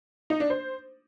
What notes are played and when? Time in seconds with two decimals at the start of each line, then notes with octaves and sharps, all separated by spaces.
0.30 D#4
0.40 D4
0.50 C5